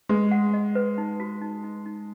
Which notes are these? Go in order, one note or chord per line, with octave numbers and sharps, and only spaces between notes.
G#3 B4
F#5
D#5
B4
D#4
F#4
D#4
D#4
D#4